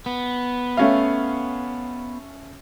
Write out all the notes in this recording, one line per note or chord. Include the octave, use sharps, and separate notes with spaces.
B3
A3 C#4 F5